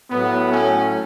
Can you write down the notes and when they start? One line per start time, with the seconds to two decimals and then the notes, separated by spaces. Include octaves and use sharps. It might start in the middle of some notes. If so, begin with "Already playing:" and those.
0.11 A2 F#3 B3
0.50 A3 C#4